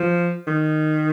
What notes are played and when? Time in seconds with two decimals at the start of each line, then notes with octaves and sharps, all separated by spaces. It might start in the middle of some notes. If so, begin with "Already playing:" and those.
Already playing: F3
0.47 D#3